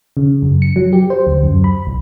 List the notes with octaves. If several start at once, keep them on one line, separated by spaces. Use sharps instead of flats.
C#3
F#2
C#7
F#3
G4
C5
D2
F#2
B5
C2